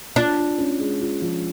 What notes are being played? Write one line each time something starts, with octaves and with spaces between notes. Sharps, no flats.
D4 F4
F4
C#4
G#3
F4
F3